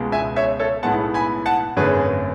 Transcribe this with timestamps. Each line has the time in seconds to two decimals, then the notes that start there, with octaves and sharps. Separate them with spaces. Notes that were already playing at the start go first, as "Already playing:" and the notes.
Already playing: C#2 B2 G#3
0.12 E5 G#5
0.36 C#5 E5
0.59 A4 C#5
0.83 B1 A2 G#3 B3 F#5 A5
1.14 G#5 B5
1.46 F#5 A5
1.77 G#1 F#2 D3 F#3 A3 G#4 B4